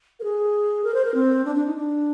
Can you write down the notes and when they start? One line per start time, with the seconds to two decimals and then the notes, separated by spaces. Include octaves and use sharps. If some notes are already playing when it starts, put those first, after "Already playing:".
0.20 A#4
0.24 G#4
0.84 A#4
0.94 C5
1.05 A#4
1.14 C4
1.45 D4
1.55 D4
1.66 D#4
1.76 D4